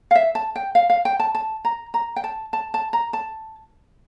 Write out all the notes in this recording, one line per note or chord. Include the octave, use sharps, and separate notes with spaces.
F5
E5
A5
G5
F5
F5
G5
A5
A5
A#5
A#5
G5
A5
A5
A5
A#5
A5